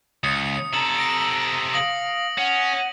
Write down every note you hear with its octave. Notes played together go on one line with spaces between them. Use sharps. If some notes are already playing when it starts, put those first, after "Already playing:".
C#2 D#6 C#7
C3 A4 A#5 F#7
A#6 D7
F5 D#6 A#6 F#7
C#4 F#5